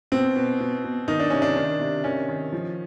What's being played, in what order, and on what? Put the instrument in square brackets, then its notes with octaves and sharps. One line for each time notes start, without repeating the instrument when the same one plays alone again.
[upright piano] B2 C4
B2
B2
B2
D#3 D#4
D4
C3 C#4
D4
D#3
C3
D#3 C#4
D#3
F3